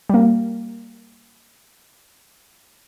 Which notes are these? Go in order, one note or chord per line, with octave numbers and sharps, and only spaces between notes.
G3 A#3